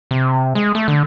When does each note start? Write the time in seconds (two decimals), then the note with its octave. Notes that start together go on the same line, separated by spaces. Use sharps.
0.11 C3
0.55 G#3
0.75 A3
0.88 D3